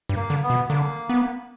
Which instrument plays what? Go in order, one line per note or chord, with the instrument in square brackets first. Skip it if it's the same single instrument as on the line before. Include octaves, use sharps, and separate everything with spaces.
[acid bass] G2
[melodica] A#3
[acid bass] D3
[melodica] B3
[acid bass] B2
[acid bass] D3 [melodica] A#3
[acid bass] B3